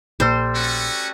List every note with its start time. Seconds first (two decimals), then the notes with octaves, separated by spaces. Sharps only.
0.20 A#1 A#2 G3 A#3 A4 C5
0.55 A3 C#4 F#4